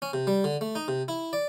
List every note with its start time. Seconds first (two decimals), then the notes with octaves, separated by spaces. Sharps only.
0.02 C#4
0.13 C3
0.27 G3
0.44 D3
0.61 A3
0.75 D#4
0.88 C3
1.08 E4
1.33 D5